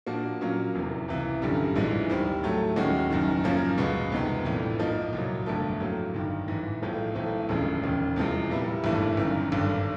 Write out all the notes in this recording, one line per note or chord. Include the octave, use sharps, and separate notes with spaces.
A#2 F3 A#3 D4 F#4
A#2 F#3 A#3 C#4 F4
F1 E2 C3
C#2 C3 E3
G1 F#2 D3 G3
A#1 G#2 E3 G#3
D#2 D#3 G3 C4
A2 F#3 A3
D#2 D#3 G#3 C#4 F#4
F#1 F#2 D#3
F#2 C#3 F3 A#3 C#4
C#2 B2 G#3 B3
F2 C3 D#3 G#3 B3
A#1 A2 E3
G#2 F3 A#3 D#4
C2 A#2 F#3
G1 F2 D3 F3 A3
A2 F#3 A#3
G1 G2 D#3
A1 G#2 E3
B1 A2 F3 G#3
B1 A2 E3 A3 C4
E1 D2 C#3 F3 G#3
E1 D#2 C#3
E2 C3 F3 G#3
A#2 G3 B3 E4
G#1 G2 E3 A3
G1 F#2 D#3
G#1 G2 D3